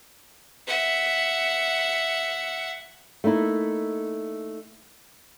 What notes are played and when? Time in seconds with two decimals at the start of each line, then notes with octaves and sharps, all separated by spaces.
0.67 E5 F#5
3.24 A3 A#3 D#4 E4